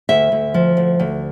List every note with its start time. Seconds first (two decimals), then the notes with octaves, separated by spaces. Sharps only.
0.09 D2 E5
0.32 D2
0.54 F3
0.77 D2
0.99 D2